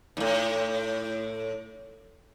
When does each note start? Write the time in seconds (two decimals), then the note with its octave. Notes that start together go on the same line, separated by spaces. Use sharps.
0.17 D#2 A2